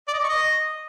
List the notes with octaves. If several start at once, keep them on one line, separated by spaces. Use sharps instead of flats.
D5
D#5
D6
C#6
D#5